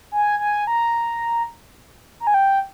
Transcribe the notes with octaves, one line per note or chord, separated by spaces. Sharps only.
G#5
G#5
A#5
A#5
G#5
G5